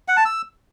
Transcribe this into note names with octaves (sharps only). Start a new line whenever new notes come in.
F#5
A5
E6